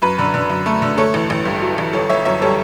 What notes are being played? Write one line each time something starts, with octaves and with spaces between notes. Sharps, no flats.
F#2 B4
D3
D3
F#2
A3
D3
A3 A4 C#5
A1
A1
G2
F#3
A1
G1 A4 C#5
G1 C#5 E5
F#2 C#5 E5
G3 A4 C#5